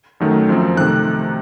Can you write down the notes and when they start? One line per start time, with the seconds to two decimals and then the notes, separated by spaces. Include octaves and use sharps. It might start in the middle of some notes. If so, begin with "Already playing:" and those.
0.20 F#2 D#3 F#3 A3
0.49 F#2 F3 C4
0.77 C3 D#3 A3 F#6